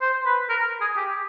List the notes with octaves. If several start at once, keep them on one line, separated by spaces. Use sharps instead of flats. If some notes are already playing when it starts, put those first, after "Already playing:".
C5
B4
A#4
G#4
G4